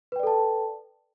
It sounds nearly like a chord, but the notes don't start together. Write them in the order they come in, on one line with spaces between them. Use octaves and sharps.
B4 G5 D5 A4 A5